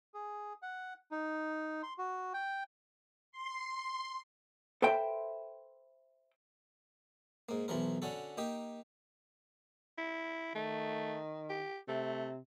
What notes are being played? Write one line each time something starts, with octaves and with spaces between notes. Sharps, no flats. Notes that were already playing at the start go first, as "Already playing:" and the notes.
G#4
F#5
D#4
C6
F#4
G5
C6
A4 B4 C5 E5 G5
G#2 A#3
B1 E3 F3 A#4
D3 C#4 F#4 A4
A#3 D#4 G4
E4
D#3 A3
G4
C3 A3